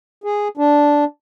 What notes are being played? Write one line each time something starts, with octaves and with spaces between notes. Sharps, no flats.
G#4
D4